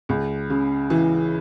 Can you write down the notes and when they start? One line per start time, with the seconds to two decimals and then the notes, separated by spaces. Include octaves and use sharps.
0.09 C#2
0.50 C#3
0.90 E3